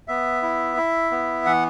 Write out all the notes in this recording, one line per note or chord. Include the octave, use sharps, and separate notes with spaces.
B3 E5
E4
E4
B3
E3 F#5